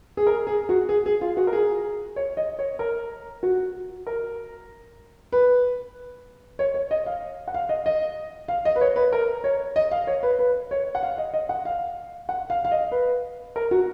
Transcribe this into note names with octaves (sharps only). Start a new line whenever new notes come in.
G#4
A#4
G#4
F#4
G#4
G#4
F4
F#4
A#4
G#4
C#5
D#5
C#5
A#4
F#4
A#4
B4
C#5
C#5
D#5
F5
F#5
F5
D#5
D#5
F5
D#5
B4
C#5
B4
A#4
C#5
D#5
F5
C#5
B4
B4
C#5
F#5
F5
D#5
D#5
F#5
F5
F#5
F5
F5
D#5
B4
A#4
F#4